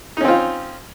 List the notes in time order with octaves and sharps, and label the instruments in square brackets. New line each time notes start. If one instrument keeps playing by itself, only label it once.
[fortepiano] D#4
C#4
C4
F4